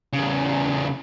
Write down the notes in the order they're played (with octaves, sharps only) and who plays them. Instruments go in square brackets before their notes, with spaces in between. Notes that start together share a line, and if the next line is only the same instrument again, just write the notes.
[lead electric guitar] E2 C#3